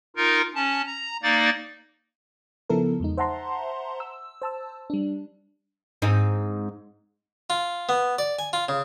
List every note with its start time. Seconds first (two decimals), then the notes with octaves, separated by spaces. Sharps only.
0.17 D#4 F4 A#4
0.55 C#4 A5
0.87 A#5
1.23 A#3 D#4 D5 A6
2.70 C#3 F3 B3 E4 A4 A#4
3.00 E2 G#3 D#4
3.18 C5 E5 F#5 A5 A#5 C6
4.00 E6
4.42 C5 A5 E6
4.90 G3 D4
6.02 G#2 C4 D#4
7.50 F4
7.89 B3
8.19 D5
8.39 G#5
8.53 F4
8.69 C#3